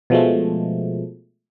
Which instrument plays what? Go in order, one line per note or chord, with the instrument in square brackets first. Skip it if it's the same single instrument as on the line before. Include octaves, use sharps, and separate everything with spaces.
[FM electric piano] B2 F3 G#3 A3